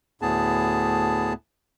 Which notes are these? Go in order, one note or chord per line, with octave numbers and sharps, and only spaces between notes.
D2 A2 B3 G#4 A5